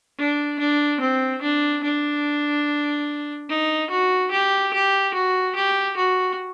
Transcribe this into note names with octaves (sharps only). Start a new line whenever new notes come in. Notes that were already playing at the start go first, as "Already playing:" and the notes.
D4
D4
C4
D4
D4
D#4
F#4
G4
G4
F#4
G4
F#4